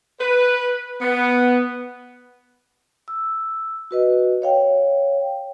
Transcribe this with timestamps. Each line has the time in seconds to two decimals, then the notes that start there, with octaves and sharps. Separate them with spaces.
0.20 B4
1.02 B3
3.08 E6
3.91 F#4 B4 D#5
4.42 C#5 F5 G5